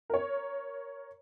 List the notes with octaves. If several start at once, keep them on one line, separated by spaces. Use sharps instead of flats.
A#4 C#5